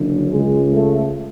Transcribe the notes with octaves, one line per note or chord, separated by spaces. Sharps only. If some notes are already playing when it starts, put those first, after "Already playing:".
Already playing: F#1 F#2 D3
C#2 C#3 G#3
A3